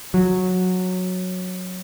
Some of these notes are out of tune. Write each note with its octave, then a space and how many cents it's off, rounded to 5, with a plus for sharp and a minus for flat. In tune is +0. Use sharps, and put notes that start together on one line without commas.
F#3 -10